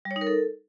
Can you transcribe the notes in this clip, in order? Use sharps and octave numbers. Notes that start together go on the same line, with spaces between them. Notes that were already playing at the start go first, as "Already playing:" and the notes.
G3
C#5
D#4
A#4
A4